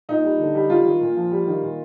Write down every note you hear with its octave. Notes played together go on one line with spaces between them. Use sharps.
A#2 D#4
G3
D3
G3
G3 F4
D#3
A#2
F3
G3
D#3
A#2